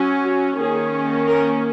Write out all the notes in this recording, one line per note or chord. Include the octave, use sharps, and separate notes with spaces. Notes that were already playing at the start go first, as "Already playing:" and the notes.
Already playing: F#3 C#4
F#4
D#3 A#3 C#4 G#4
A#4